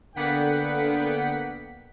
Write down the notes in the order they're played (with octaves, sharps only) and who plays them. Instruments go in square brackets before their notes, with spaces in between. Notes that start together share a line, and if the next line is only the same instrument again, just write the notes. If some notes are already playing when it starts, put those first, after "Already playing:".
[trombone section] D3 [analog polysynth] A#3 F#5 B6 [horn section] B3 G5